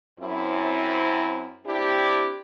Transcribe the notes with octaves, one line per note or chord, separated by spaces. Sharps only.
F#2 C4 E4
C4 D4 E4 G4